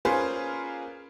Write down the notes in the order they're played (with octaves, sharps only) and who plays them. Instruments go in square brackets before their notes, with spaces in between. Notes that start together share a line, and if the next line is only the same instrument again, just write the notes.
[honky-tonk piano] A#3 C#4 F4 G#4 B4 C5